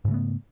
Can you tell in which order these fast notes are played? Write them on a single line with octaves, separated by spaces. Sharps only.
G#2 C#3 A3 B3